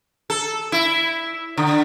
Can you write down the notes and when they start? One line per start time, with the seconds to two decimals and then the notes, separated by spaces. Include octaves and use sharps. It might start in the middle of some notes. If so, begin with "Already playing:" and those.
0.30 A4
0.72 E4
1.57 D3